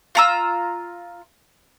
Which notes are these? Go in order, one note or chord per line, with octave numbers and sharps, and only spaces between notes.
F4 A#5 E6